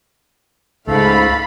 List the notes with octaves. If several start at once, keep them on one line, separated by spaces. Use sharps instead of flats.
C#2 G#2 A3 A4 F5 B5